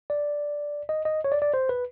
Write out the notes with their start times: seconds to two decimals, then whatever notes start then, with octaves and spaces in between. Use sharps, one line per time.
0.10 D5
0.89 D#5
1.05 D#5
1.24 C#5
1.32 D5
1.42 D5
1.54 C5
1.69 B4